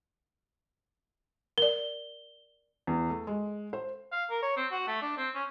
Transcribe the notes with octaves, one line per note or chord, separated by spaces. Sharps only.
A#4 D5 G7
E2
A3
G#3
C5
F5
A#4
C#5
C4
F#4
A3
D4
C4
C#4